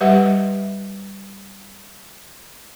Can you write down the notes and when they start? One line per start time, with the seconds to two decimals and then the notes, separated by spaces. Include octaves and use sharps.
0.01 G3 G4 B4 D#5 E5 F#5